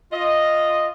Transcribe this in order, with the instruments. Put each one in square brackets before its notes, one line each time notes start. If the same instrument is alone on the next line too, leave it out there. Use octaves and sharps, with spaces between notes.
[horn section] F4 D#5